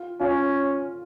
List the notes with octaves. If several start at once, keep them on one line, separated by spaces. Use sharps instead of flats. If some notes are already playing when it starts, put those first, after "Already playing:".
Already playing: F4
C#4 F4